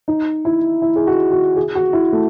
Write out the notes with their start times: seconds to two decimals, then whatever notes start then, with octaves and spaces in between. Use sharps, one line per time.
0.08 D#4
0.45 E4
0.82 E4
0.96 G#4
1.07 F#4
1.32 F#4
1.56 G#4
1.75 F#4
1.93 E4
2.13 A3